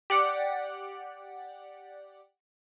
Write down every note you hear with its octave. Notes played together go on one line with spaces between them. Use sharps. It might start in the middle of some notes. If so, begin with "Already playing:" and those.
G4 D5 F#5